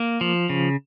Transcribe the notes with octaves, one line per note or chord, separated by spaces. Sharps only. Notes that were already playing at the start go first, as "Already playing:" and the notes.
Already playing: A#3
F3
C#3